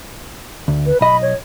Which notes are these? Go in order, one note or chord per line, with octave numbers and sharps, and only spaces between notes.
D2
B4
B1 D#5 B5
C#5